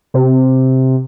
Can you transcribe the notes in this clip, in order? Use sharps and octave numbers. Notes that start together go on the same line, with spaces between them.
C3